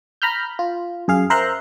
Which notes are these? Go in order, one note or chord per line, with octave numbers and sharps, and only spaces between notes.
A#5 B5 F6 G6
F4
F#2 G#4 F5
A#4 C5 E5 A#5 C6 F#6